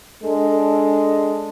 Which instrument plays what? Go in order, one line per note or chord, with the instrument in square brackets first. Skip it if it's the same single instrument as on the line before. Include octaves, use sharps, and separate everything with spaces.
[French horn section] G#3 D4 A4